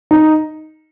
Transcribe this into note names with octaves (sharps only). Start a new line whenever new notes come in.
D#4